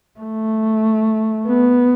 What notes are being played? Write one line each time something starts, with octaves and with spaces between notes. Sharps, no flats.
A3
B3